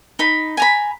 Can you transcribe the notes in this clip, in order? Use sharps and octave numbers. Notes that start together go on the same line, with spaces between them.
D#4 B5
G#5 A#5 B5